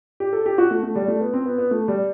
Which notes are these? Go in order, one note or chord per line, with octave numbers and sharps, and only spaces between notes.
G4
A4
G4
F#4
A3
A3
G3
A3
B3
C4
B3
B3
A3
G3